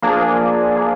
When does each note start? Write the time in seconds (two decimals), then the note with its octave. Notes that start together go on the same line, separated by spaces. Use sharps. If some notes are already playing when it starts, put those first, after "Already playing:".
0.02 F3 A#3 D4 G#4
0.76 F3 A#3 D4 G#4